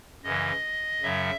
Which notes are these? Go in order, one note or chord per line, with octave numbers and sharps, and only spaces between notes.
F#2 C#3 E3 D#5
F#2 C#3 F#3 E5